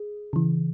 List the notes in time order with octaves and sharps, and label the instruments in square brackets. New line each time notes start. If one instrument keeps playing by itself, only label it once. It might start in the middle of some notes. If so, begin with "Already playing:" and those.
Already playing: [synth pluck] G#4
C#3 E3